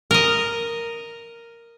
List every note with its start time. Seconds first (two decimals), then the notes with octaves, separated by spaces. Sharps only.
0.11 A#4 D#5